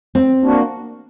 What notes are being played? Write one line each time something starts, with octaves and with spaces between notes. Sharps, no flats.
C4
A#3 D4 F#4